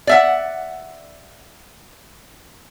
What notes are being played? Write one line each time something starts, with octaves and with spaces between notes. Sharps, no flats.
D5 E5 F#5